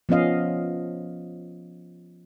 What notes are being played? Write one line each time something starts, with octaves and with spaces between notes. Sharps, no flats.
F3 B3 C#4 D#5 F5